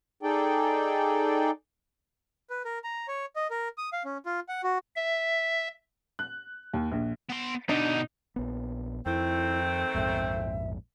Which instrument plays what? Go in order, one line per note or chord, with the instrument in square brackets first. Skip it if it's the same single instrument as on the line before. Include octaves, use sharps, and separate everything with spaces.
[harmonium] D#4 G#4 A4 D5 G5
[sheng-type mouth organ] B4
A#4
A#5
C#5
D#5
A#4
D#6
F5
C#4
F4
F#5
F#4
[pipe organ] E5
[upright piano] F#6
D#2
A#1
[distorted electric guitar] B3 C6
[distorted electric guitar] B2 D3 [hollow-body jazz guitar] D4 [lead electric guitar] D#4
[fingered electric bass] A#1 B3
[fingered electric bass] F2 [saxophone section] D#3 A3 C4 [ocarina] E4
[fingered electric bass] A#1 F2 G#2 [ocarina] E5